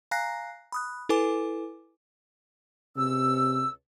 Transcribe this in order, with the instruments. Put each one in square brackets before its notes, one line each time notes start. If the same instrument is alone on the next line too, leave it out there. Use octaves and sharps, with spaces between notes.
[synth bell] F5 G#5 A#5 F#6 A#6 C7
B5 D#6 F#6
E4 A4 B4 G#5 D6
[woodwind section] C#2 E6 [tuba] C3